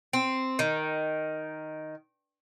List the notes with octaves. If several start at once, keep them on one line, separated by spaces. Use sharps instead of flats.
C4
D#3